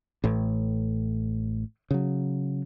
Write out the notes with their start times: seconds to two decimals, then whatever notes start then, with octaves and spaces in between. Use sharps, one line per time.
0.24 A1 A2
1.91 C#3 F#3